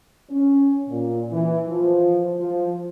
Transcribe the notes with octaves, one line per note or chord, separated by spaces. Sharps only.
C#4
A#2
E3
F3
F3